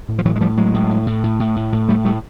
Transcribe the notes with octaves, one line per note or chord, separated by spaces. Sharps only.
A2
F3
A2 E3 F#3
G#3
A2 F3 G3
A2 F#3 G#3
A2
A2
A2
A2
A2
A2
A2
A2 G3 A3
A2 G3 A3